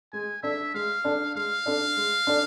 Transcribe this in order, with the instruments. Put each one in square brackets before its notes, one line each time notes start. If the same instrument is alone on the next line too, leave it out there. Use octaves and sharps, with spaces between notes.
[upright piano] G#3 [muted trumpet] G#5
[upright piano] D4 A4 D5 [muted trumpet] E5
[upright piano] G#3 [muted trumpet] F5
[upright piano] D4 A4 D5
[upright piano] G#3 [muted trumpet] F5
[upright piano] D4 A4 D5
G#3
D4 A4 D5